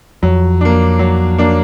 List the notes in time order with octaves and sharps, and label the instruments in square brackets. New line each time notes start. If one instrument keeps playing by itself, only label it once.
[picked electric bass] F2 [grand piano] F#3
[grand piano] A#3 D4
F#3
A#3 D4